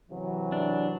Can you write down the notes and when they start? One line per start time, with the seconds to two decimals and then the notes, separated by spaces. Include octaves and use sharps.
0.11 C3 E3 F#3
0.52 D4